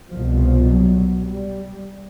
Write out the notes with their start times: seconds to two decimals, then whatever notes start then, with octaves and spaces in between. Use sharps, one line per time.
0.12 C2 B2 F3
0.41 F3
0.70 F#3
1.29 G3